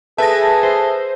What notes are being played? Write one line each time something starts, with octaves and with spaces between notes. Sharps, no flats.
G#4 A4 B4 E5 A5 A#6
C5